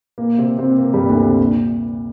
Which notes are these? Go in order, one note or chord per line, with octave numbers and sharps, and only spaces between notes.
A#2 A#3
C3 C4
C3 C4
A#2 A#3
G2 G3
D2 D3
C3
A#2